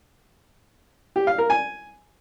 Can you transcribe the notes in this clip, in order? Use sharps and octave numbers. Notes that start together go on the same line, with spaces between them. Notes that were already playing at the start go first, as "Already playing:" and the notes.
G4
F5
A#4
G#5